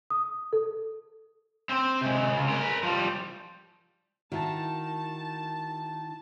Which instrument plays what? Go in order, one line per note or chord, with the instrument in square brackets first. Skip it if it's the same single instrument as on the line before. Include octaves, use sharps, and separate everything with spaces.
[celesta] D#6
A4
[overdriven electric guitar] C4 C5
C3 G#3
C#2
G#3 A#4
A#4 B4
F3 G3
[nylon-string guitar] D#3 [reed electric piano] E4 F#4 [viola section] A5